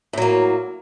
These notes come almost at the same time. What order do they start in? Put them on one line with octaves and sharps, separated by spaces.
A2 F#3 A#3